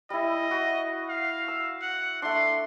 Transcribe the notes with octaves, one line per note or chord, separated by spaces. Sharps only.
G3 E4 D#5
F#4
F5
E6
F#5
A3 D4 C6